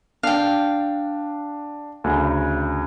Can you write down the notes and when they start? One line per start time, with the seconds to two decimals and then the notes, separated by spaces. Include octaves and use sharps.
0.23 D4 F5 G5
2.04 D2 C#3